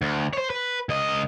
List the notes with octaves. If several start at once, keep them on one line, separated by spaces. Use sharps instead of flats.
D2
C5 C#5
B4
C#2 D#5